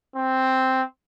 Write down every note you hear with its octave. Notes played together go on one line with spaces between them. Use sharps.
C4